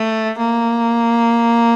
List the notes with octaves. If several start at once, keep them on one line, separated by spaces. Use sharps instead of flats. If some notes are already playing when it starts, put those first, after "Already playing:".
Already playing: A3
A#3